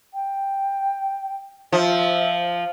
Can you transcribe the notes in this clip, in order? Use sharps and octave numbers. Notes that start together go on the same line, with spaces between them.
G5
F3 E5